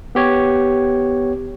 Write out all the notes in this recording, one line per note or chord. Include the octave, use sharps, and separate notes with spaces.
B3 G4 C#5